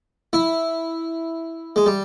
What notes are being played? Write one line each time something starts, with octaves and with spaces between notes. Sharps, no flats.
E4
G#3
G3